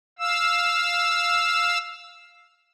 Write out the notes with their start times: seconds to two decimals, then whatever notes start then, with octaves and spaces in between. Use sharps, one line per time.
0.19 F5 E6